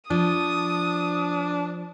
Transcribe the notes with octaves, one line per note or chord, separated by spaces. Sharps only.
F3 D4 D#6